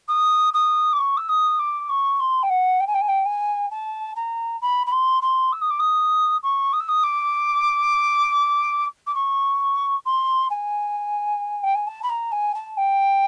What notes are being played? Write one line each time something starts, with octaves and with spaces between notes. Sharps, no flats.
D#6
D#6
D6
C#6
E6
D#6
D6
C#6
C6
G5
F#5
G5
G#5
G5
G#5
G5
G#5
A5
A#5
B5
B5
C6
C6
E6
D#6
D6
D#6
C#6
D#6
E6
D#6
D6
D6
C#6
C6
G#5
G5
G#5
A5
B5
A#5
G#5
A5
G5